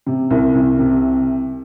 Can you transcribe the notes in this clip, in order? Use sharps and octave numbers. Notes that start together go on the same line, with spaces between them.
C3
C2
C2
C3